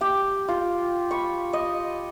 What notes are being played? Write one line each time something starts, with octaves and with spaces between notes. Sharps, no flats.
G4 G5
F4
B5 C#6
D#5